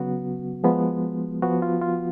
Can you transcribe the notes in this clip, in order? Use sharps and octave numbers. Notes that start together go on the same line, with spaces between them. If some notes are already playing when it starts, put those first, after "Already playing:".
Already playing: C#3 F#3 B3 F#4
F3 G#3 B3
F3 B3 F#4
F4
F4